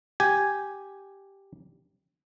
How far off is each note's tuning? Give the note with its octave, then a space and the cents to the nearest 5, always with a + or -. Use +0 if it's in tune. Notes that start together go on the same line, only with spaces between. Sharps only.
G4 +0 G#5 +0